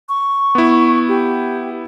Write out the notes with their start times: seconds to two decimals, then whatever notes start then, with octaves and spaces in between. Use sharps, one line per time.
0.09 C#6
0.55 B3 E4
1.08 G4